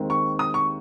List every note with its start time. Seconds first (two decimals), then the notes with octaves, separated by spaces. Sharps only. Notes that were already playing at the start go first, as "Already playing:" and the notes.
Already playing: D#2 D#3 G#3 C4
0.10 C#6
0.39 D#6
0.54 C#6